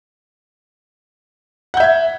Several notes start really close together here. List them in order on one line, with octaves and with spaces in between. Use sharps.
F#5 G6 E5 G#6